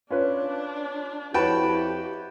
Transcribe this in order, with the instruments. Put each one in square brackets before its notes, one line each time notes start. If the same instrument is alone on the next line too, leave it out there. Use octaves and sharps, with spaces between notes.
[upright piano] C#4 F4 B4 [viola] D4
[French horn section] F2 E4 [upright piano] F#4 C#5 [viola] G4 [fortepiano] B4 G5 A5